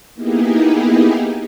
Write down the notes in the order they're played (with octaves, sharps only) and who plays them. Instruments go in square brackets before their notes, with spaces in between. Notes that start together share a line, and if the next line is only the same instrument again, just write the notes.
[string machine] A#3 B3 D#4 E4 G4 G#4